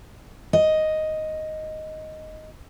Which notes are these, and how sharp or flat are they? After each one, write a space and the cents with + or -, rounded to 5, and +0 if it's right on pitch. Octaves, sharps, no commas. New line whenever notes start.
D#5 +5